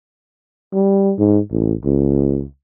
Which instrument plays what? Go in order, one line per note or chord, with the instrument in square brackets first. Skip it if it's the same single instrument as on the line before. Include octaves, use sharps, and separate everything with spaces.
[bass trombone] G3
G#2
A1
C#2